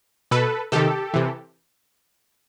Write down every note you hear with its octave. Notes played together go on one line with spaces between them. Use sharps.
B2 A4 B4
C3 D#3 G4 A4
C3 E3